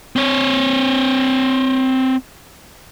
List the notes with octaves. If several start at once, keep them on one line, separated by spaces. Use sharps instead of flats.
C4 C#5